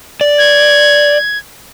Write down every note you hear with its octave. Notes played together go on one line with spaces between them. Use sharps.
D5
G#6